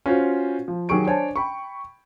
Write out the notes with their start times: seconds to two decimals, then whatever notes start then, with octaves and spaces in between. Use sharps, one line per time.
0.06 C#4 F4 F#4 C5
0.68 F3
0.89 D#3 F#3 G4 G#4 C#6 D7
1.06 D4 C5 C#5 G#5 A5
1.36 G5 B5 C#6